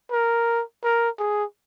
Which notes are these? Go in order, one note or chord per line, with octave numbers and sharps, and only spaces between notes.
A#4
A#4
G#4